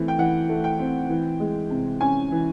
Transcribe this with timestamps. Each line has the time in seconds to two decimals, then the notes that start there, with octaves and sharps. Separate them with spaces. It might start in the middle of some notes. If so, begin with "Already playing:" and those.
Already playing: E3 A3 C4
0.08 G5
0.18 E3 F#5
0.49 A3
0.64 G5
0.79 C4
1.09 E3
1.40 G#3
1.70 C3
2.01 C#4 G#5
2.32 E3